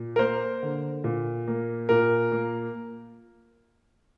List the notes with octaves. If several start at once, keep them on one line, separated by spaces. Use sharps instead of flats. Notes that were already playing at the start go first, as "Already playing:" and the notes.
Already playing: A#2
A#4
A#3 C5
D3
A#2
A#3
A#2 A#4
A#3